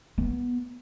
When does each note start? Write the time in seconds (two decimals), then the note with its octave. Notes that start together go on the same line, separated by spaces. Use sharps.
0.18 B3